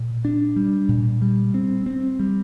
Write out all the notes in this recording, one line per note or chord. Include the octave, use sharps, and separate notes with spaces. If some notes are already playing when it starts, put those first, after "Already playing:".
Already playing: A#2
D4
G3
A#2
G3
C4
C4
G3